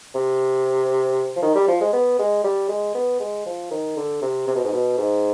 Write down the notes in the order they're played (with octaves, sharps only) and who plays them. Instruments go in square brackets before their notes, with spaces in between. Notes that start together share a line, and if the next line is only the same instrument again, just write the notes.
[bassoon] C3
F3
D#3
G3
F3
G#3
B3
G#3
G3
G#3
B3
G#3
F3
D#3
D3
C3
C3
B2
G#2
B2
G#2